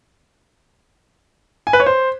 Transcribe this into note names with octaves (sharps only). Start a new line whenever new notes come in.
G#5
B4
C#5
C5